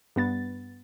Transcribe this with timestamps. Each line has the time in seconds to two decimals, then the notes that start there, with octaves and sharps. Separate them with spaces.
0.16 G2 B3 A6